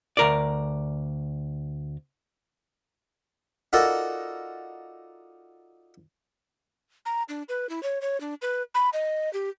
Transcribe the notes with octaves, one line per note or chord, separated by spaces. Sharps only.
D2 A#4 D5
D#4 F4 F#4 A4 A#4 D5
A#5
D4
B4
E4
C#5
C#5
D4
B4
B5
D#5
G4